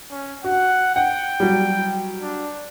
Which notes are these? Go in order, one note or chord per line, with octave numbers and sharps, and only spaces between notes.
C#4
F#4 F#5
F#5 G5
F#3 G3
D4